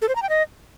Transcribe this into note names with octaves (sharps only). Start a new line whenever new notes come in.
A4
C5
A#5
G5
D#5